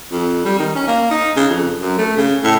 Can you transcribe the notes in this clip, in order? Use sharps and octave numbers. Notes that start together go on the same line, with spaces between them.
F2
G3
D#3
C#4
A#3
D#4
C#3
F2
F#2
A3
C#3
A2